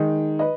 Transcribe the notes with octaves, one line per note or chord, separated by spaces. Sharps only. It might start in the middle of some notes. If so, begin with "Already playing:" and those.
Already playing: D#3 G#3 D#4
B4 D#5